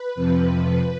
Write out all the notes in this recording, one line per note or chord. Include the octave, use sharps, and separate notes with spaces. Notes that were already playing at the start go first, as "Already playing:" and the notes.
Already playing: B4
F2 C3 F3